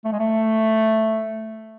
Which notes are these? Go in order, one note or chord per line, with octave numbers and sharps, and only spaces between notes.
A3
G#3
A3